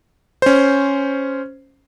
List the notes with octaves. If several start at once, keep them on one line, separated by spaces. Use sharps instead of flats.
C#4 C5